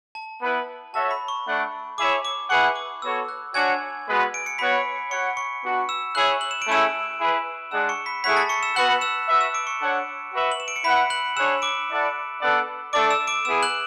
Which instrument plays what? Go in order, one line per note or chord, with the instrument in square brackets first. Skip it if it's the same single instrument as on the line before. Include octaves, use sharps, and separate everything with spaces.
[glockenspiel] A5
[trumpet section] B3 E4 B4
[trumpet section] F#4 A4 C#5 E5 [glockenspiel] A5
[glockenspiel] B5
C#6
[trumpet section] A3 D4 A4 D5 F#5
[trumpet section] E4 G#4 C#5 E5 [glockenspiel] D6
[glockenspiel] D6
[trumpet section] E4 G#4 B4 F#5 [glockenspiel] C#6
[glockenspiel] D6
[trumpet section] B3 F#4 A4 C#5 [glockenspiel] E6
[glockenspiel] F#6
[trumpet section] D4 F#4 C#5 F#5 [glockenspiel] G#5 G#6
[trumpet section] G#3 B3 F#4 B4
[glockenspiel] D7
C#7
[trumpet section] B3 F#4 C#5 F#5 [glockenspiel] B5 B6
[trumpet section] F#4 C#5 F#5 [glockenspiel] C#6 C#7
[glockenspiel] C#6 C#7
[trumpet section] B3 D4 F#4
[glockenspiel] E6 E7
[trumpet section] E4 G#4 C#5 E5 [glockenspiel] F#6 F#7
[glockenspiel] F#7
E7
D7
[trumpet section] A3 C#4 E4 G#4 [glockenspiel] E6 E7
[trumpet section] E4 G#4 B4
[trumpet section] G#3 D4 G#4 D5 F#5 [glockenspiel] E6 E7
[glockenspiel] C#6 C#7
B5 B6
[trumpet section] A3 E4 G#4 C#5 F#5 [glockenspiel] B5 B6
[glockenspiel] A5 A6
C#6 C#7
E6 E7
[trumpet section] B3 F#4 B4 F#5 [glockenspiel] F#6 F#7
[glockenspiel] E6 E7
[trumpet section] F#4 B4 E5
[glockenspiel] E6 E7
D6 D7
C#6 C#7
[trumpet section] D4 A4 C#5 F#5
F#4 B4 E5
[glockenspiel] F#7
E7
D7
C#7
[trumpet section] E4 B4 F#5 [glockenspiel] B5 B6
[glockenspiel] F#6 F#7
[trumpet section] D4 G#4 C#5 F#5 [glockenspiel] E6 E7
[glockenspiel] D6 D7
[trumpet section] E4 A4 D5 F#5
B3 D4 A4 D5 F#5
[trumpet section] A3 D4 A4 D5 [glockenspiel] D6 D7
[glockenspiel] E6 E7
D6 D7
[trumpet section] B3 E4 G#4 [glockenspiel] E6 E7
[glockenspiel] F#6 F#7